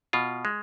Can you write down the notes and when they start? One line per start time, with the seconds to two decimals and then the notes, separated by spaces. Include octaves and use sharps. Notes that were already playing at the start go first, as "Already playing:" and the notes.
0.13 B2 F4
0.45 G#3